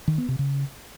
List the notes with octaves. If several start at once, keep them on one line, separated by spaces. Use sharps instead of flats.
D#3
B3
C3
C#3